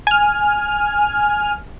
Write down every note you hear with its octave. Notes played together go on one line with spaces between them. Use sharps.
G#5 F6